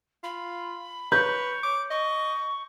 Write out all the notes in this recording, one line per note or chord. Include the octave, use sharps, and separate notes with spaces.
F4 B5
B4 C#5 G6
D6
D#5 C#6